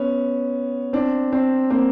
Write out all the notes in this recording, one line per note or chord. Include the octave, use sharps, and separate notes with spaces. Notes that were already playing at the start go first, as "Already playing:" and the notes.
Already playing: B3 C#4
C4 D4
C4 D4
A#3 C4